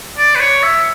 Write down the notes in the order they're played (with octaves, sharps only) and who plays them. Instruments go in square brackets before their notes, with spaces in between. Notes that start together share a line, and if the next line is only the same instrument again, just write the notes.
[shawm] D5
B4
C#5
E5